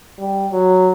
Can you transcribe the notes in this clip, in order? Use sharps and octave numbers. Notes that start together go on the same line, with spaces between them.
G3
F#3